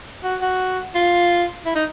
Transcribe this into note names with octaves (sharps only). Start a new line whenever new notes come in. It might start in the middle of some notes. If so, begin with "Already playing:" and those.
F#4
F#4
F4
E4
D#4